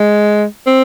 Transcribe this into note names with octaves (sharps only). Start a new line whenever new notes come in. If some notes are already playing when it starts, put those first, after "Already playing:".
Already playing: G#3
C4